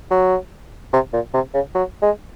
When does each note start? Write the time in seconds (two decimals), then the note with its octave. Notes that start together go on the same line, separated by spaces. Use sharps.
0.11 F#3
0.93 C3
1.13 A#2
1.34 C3
1.54 C#3
1.75 F#3
2.02 G#3